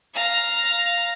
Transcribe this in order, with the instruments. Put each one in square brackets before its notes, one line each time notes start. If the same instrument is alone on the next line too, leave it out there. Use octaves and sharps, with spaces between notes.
[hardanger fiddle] F5 A#5